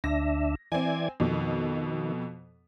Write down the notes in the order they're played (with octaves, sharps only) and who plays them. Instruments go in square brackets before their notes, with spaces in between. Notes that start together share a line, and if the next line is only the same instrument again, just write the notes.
[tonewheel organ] D2 D4 E5 [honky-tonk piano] A#6
[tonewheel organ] E3 D5 G#6 [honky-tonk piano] C4 G#5
[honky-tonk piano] F2 B2 [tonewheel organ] D#3